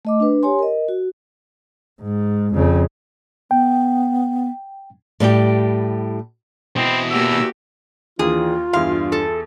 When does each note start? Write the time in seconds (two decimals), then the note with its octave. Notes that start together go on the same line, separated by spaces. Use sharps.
0.05 A3 D#5 D6
0.20 D4 B4
0.43 G4 C#5 G#5 C6
0.59 A#4 D#5
0.88 F#4
2.02 G#2
2.54 F2 C#3
3.51 B3 G5
5.20 A2 G3 G4 G5
6.77 B2 C4 E4 D#5
7.11 E2 A#3 F#4 G4 E6
8.19 D#2 E3 D4 F4 G#4
8.73 E2 G2 E4 F5 C6
9.12 A4